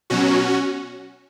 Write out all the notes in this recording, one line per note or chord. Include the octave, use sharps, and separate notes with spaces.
B2 F#3 C#4 F#4